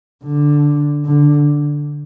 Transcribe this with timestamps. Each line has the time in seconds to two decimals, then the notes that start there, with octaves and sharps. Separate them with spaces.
0.24 D3
1.05 D3